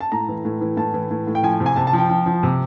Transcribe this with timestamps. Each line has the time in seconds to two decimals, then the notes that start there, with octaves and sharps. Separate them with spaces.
0.01 A5
0.12 A2 A#5
0.29 E3
0.45 A2
0.61 E3
0.77 A2 A5
0.94 E3
1.11 A2
1.27 A2
1.35 G5
1.43 F3 G#5
1.60 C3
1.66 G#5
1.76 C3 A5
1.87 A5
1.93 F3
1.99 G5
2.09 F3
2.26 F3
2.43 C3